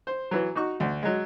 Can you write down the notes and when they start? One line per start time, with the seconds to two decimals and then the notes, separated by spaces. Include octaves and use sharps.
0.07 C5
0.31 E3 F#3
0.55 D#4 F#4 C#6
0.80 D2
1.03 F#3 G#3